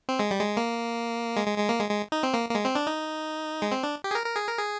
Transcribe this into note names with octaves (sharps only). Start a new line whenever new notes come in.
C4
G#3
G3
G#3
A#3
G#3
G#3
G#3
A#3
G#3
G#3
D#4
C4
A#3
A#3
G#3
C4
D4
D#4
G#3
C4
D4
G4
G#4
A#4
A#4
G#4
A#4
G#4